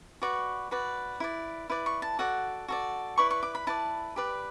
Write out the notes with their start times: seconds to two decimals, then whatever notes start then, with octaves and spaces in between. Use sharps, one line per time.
0.22 F#4 B4 D5 C#6
0.71 F#4 B4 D5
1.20 E4 B4 D5
1.70 E4 B4 D5
1.86 C#6
2.02 A5
2.19 F#4 A4 D5 F#5
2.68 F#4 A4 D5
3.18 E4 B4 D5 C#6
3.31 C#6
3.43 D6
3.55 B5
3.67 E4 B4 D5 A5
4.16 G4 B4 D5